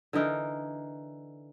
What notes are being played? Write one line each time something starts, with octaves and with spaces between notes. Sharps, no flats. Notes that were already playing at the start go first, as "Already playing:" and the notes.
D3 E3 D#4 A#4